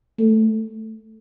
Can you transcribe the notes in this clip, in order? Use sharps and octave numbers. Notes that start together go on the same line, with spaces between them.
A3